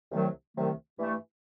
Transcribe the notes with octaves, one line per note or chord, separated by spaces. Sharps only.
C2 C3 D#3 F#3 A3
C2 C3 D#3 F#3 A3
G2 E3 A3